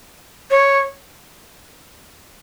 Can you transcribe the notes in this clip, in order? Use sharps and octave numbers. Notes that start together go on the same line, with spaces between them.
C#5